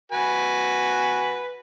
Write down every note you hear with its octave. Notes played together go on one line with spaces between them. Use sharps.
F#4 B4 G#5